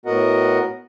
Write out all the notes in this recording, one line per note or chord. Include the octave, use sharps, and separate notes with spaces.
A2 B3 F#4 A#4 D#5 F#5